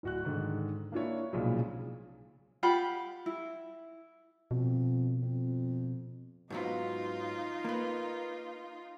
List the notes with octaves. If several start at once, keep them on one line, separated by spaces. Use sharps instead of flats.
D1 F#4 F#6
G#2 D3 D#3
A#3 D4 E4 C#5
B1 A#2 C#3 F3 F#3 G#3
F4 G4 F#5 B5
E4
F2 B2
F2
G#2 F#3 B3 D#4 F4
A#3 B4